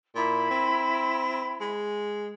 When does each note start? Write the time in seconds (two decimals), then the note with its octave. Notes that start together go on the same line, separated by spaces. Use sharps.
0.15 A#2 E4 B5
0.51 C4
1.61 G#3